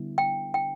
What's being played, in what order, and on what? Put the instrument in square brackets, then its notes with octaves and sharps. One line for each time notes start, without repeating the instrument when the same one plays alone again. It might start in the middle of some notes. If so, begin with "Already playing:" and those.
Already playing: [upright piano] D3 G3 B3 E4
[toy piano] G5
G5